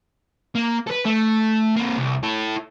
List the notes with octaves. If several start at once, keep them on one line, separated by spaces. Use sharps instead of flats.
A#3
A4 B4
A3
A#3 C4
C2
E4 A4